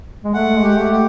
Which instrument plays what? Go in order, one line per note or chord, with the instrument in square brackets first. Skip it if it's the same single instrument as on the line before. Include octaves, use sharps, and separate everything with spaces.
[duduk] G#3
[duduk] A3 [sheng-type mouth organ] F#5
[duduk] G#3
[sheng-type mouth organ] G4
[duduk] A3
[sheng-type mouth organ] G4